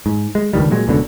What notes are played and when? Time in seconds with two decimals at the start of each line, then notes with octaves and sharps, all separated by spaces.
0.06 G#2
0.35 G#3
0.53 C#2 G2 D#3 G3
0.71 A#2 F#3 G#3
0.87 E1 C#2 B2 D3